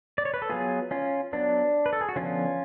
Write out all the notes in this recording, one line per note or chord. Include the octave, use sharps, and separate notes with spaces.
D5
C#5
B4
A4
F#3 B3 F4 G#4
C#4 F4
F#3 B3 D4
B4
A4
G#4
F#4
D3 F3 B3 C#4 F4